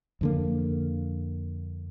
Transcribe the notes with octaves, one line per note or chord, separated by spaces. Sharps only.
F2 D3 A#3